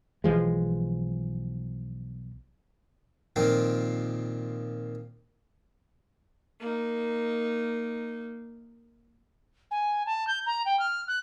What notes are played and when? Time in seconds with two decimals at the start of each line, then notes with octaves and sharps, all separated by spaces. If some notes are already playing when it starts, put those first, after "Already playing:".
0.24 B1 E3 F3 G#3
3.36 A#2 D#3 F3 C4 F4
6.60 A#3 D#4
9.71 G#5
10.06 A5
10.27 G6
10.46 A#5
10.65 G5
10.79 F6
11.08 F#6